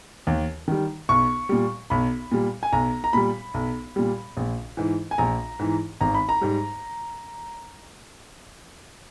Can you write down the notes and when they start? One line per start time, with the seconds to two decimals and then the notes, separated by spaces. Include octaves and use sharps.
0.27 D#2
0.68 D#3 G3
1.09 B1 C#6
1.49 A#2 G3
1.90 B1 B5
2.32 A#2 G3
2.63 G#5
2.73 B1 A#5
3.04 A#5
3.13 A#2 G3 B5
3.54 B1
3.96 A#2 G3
4.37 A#1
4.77 G#2 E3
5.11 G#5
5.18 A#1 A#5
5.59 G#2 E3
6.01 G#1 A#5
6.14 B5
6.29 A#5
6.41 G#2 G3